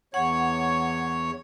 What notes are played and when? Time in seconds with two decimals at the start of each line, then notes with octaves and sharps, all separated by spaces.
0.14 E2 C#5 F#5